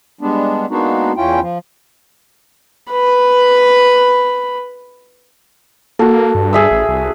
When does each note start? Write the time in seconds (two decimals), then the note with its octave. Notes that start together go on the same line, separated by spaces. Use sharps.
0.21 G3 G#3 B3 D4
0.70 G#3 A#3 B3 D4 D#4 F#4
1.17 E2 C#4 E4 F4 G5
1.41 F3
2.92 B4 B5
5.99 A#3 F#4 A4
6.35 G2
6.53 G#4 E5 E6
6.71 A1
6.89 C2